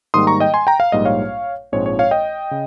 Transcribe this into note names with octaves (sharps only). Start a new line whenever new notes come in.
G#2 D#3 G3 A#3 C6 D#6
A#5 C#6
D#5 G5
G#5 C6
G5 A#5
F5
A#1 G#2 G3 A#3 D#5
C#5 F5
A#1 G#2 F3 G#3 C4 C#5
C#5
C#5 F5
D#5 G5
C#3